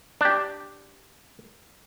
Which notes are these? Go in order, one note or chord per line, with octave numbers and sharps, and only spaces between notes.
D4 G4